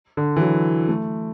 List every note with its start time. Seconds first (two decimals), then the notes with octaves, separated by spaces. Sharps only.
0.17 D3
0.36 E3
0.41 F#3
0.88 A3